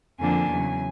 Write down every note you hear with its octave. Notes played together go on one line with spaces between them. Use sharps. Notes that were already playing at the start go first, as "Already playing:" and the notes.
F2 D3 F3 A#3 D4 G#5
E2 C#3 F#3